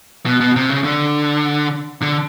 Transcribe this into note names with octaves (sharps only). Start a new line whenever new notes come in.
B2
B2
C3
C#3
D3
D3